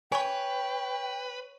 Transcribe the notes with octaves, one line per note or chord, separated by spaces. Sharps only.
B4 C#5 G5 G#5 C#6